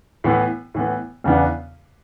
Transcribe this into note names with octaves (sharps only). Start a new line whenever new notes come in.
A2 E3 B3
A2 E3 B3
E2 C#3 E3 B3 D4